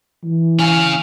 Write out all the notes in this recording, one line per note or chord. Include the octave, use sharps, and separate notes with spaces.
E3
C#4 F5 G#5